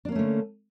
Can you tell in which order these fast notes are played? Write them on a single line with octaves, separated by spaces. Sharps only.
D4 A#3 C#4 A3 D3